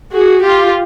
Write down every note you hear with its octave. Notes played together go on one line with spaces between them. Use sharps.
F#4 G#4
F4 G4